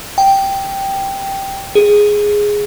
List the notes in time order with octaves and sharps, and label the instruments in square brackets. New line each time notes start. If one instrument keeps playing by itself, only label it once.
[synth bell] G5
G#4